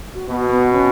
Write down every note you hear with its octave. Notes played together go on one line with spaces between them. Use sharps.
F#4
B2 B3
B3
C#4